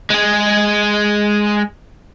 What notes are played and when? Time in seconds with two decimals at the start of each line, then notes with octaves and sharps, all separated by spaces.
0.10 G#3 G#4